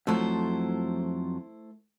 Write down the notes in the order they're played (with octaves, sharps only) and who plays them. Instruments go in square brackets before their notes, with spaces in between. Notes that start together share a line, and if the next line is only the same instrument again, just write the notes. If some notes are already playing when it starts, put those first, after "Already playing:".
[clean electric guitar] F2 F3 F#3 [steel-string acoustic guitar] A3 E4 C5